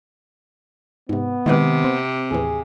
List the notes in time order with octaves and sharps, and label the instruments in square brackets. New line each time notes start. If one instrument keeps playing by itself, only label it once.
[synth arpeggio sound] G#2 C3 [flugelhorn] B3
[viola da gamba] C3 [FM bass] D#3 [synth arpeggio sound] G#3 E4 B4
[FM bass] C4
[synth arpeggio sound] D#2 A2 E3 [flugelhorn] G#4